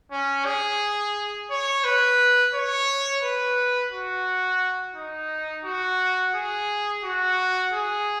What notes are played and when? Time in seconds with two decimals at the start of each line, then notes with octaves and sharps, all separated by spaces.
0.12 C#4
0.46 G#4
1.50 C#5
1.84 B4
2.54 C#5
3.23 B4
3.92 F#4
4.96 D#4
5.65 F#4
6.35 G#4
7.04 F#4
7.73 G#4